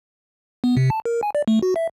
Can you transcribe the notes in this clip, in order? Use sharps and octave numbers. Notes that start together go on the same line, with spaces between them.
B3
C3
A5
A#4
G#5
D5
A3
F#4
E5